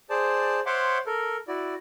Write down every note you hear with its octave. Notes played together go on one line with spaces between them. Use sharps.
G#4 C5 D5 A5
C5 C#5 E5 F#5 C6 D6
A4 A#4
E4 F#4 D5